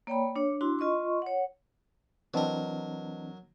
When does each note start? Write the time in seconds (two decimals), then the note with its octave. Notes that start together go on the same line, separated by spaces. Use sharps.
0.07 A#3 C#5 D5 G5 A#5 B5
0.36 D4 C#5
0.61 D4 E4 F#4 C6
0.79 F4 D#5 C6 C#6
1.22 C#5 F#5
2.34 E3 F#3 C4 D4 A#4 B4 D#5 A5